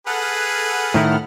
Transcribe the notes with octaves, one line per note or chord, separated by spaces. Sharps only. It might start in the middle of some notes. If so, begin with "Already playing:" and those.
G#4 A4 B4 F#5 F6
A2 D#3 E4